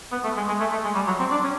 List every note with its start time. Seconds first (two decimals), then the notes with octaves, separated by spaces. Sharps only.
0.12 B3
0.24 A3
0.37 G#3
0.48 G#3
0.60 A3
0.72 A3
0.84 G#3
0.95 G3
1.07 F#3
1.19 C4
1.31 D4
1.44 C#4